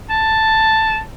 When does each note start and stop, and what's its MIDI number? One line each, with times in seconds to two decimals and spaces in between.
0.10 0.99 81